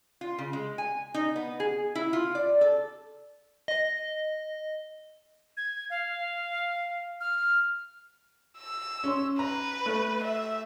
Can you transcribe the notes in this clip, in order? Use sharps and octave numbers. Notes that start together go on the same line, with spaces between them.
F4
C#3
G#3
G#5
D#4
B3
G#4
E4
F4
D5
A4
D#5
G#6
F5
F6
E6
C#4 C6
B4 A#5
A3
E5